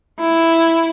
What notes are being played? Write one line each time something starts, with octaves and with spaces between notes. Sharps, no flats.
E4